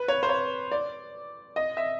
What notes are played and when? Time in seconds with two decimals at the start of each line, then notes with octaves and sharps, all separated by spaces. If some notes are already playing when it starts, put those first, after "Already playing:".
Already playing: B4
0.08 C#5
0.23 C5
0.29 C#5
0.72 D5
1.56 D#5
1.77 E5